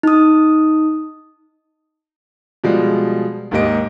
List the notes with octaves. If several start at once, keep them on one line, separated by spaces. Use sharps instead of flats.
D#4 D#6
B2 F3 G3 G#3
D#2 G#2 A#3 G4 D#5 D7